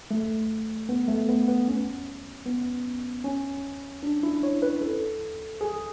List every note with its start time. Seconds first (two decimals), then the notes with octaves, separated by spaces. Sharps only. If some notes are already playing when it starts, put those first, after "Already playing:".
0.11 A3
0.89 B3
1.08 A3
1.28 B3
1.48 B3
1.68 C#4
2.46 B3
3.24 C#4
4.03 D4
4.23 E4
4.43 C#5
4.62 B4
4.82 A4
5.61 G#4